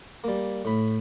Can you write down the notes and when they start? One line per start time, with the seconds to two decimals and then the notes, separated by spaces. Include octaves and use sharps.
0.24 G3 A#3
0.65 A2 B5